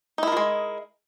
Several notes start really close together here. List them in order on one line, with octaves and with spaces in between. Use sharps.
D#4 E4 A#4 F3 G#3